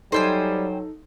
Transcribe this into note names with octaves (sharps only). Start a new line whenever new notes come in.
F#3 G3 D#4 A4 C5 G5 G#5